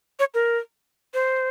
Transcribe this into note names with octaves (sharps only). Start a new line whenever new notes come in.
C#5
A#4
C5